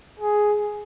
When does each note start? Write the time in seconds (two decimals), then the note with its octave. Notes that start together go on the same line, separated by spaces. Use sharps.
0.19 G#4